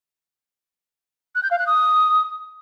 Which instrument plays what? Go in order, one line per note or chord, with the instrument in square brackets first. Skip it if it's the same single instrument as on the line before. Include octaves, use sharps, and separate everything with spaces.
[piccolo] F#6
G6
F5
F#6
D#6